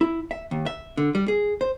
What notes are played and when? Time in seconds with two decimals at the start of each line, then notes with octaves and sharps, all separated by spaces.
0.01 E4
0.31 E5
0.51 D#2
0.66 E5
0.97 D3
1.15 G3
1.28 G#4
1.61 C5